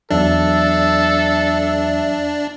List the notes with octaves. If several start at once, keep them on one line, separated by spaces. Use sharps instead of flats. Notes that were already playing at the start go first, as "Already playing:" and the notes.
E2 F#3 D4 A4 E5